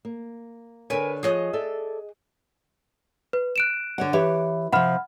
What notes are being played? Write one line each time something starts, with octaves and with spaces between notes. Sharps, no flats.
A#3
D3 A#4 B4 C#5 G#5
F3 G#4 C#5 D#5 F#6
A4 D5 E5
B4
F#6 D7 E7
D3 C#5 F#5
E3 G4 C#5
C3 F3 F#5 B5 F6